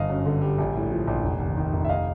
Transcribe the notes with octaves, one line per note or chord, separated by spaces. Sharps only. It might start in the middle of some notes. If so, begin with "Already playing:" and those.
Already playing: G1 D#5 F5
F#2
D3
G3
A#1
A2
F3
A#1
F1
D#2
D#3
F1
E5
D#5 F5